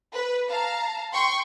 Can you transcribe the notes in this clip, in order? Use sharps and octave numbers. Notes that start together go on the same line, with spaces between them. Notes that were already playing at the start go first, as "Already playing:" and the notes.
B4
F5 A5 A#5
G5 C6 C#6